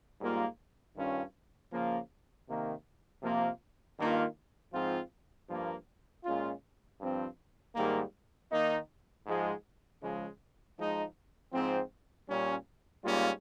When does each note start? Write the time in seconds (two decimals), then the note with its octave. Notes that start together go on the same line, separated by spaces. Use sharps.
0.20 G#2 G3 A#3 F4
0.95 G2 D#3 G3 C#4 F4
1.71 C#3 F3 A#3
2.46 C3 D#3 A#3
3.22 C3 F3 A#3 F4
3.98 G2 D#3 A#3 F4
4.73 G#2 F3 C4 F4
5.49 G2 F3 A#3
6.24 A#2 G#3 C#4 F4
7.00 G2 F3 C4
7.75 G#2 D#3 G3 A#3
8.52 D#3 A#3 D#4
9.27 G#2 F3 G#3
10.02 C#3 F3 G#3
10.78 F3 G#3 D#4
11.53 G#2 F3 C4
12.28 A#2 G3 C#4
13.04 G#2 G3 A#3 C#4 F4